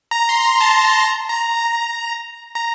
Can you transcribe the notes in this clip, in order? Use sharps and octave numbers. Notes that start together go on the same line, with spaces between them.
A#5
C6
A#5
A5
A5
A#5
A#5
A#5